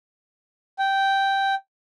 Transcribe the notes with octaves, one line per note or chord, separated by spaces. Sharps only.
G5